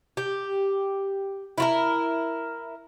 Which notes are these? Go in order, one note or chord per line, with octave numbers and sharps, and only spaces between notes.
G4
E4 F4 A#4